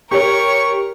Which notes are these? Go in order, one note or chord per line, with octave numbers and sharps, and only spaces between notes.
G4 A#4 C#5 C#6